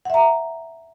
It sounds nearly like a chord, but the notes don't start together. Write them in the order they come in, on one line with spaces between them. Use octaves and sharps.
F#5 E5 A#5